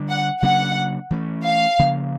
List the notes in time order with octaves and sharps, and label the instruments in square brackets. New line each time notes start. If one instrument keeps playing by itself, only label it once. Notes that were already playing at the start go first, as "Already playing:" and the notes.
Already playing: [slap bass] D3 G3 D4
[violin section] F#5
[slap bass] C#3 F#3 A#3 D4 [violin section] F#5
[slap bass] E3 A3 C#4
[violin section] F5
[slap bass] C#3 F3 A#3